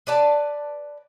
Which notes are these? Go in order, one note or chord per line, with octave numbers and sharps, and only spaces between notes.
B4 D5 A5